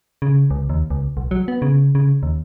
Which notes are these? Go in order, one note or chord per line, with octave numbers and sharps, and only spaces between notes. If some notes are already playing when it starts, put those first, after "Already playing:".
C#3
C#2
D#2
C#2
B1
F#3
B3
C#3
C#3
D#2